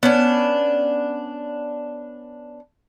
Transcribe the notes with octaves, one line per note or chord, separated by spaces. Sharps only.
B3 C#4 D4